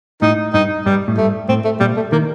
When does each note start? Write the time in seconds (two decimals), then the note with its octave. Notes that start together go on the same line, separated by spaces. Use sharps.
0.22 A2 D#4
0.54 G2 D#4
0.86 G2 G3
1.08 A2
1.18 G2 A3
1.49 A2 C4
1.65 A3
1.80 A#2 G3
1.96 A3
2.12 D#3 A#3